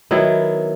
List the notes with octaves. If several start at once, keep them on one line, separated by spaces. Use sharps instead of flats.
D#3 F#3 B3 E4